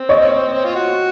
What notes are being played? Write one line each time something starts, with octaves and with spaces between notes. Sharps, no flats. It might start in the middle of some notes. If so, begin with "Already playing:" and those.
Already playing: C4
C#5 D#5
F4
F#4